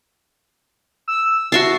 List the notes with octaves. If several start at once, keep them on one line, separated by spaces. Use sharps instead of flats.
E6
F#4 E5 A5 C7